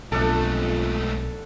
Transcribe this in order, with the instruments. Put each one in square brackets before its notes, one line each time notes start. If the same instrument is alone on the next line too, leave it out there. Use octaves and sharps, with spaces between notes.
[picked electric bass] B1 [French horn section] F2 F4 [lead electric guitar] G#2 A3 [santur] D4 A4